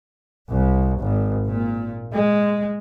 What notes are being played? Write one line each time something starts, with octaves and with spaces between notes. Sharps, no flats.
C2
G#1
A#2
G#3